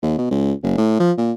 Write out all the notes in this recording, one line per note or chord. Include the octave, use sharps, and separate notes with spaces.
D#2
B2
C#2
F#1
A2
F3
A#2